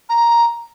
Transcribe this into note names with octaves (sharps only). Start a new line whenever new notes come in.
A#5